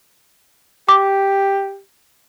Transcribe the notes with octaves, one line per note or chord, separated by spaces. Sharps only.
G4 D6